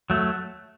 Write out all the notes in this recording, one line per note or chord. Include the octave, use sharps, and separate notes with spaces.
F#3 A3